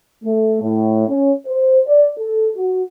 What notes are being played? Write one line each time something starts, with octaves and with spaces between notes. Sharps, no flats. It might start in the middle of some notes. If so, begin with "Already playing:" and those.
A3
A2
C#4
C5
D5
A4
F#4